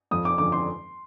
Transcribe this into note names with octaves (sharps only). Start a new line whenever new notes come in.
F2 D#6
D6
D3 F3 D6
C6